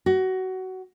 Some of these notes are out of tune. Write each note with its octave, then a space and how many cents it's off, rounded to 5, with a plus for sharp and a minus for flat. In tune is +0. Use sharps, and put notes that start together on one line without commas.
F#4 +20